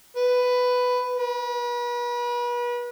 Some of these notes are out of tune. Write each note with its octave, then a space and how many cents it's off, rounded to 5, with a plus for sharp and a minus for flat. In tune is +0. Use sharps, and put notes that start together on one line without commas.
B4 +10
B4 -35